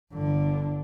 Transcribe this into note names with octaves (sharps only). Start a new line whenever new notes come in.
G1 D3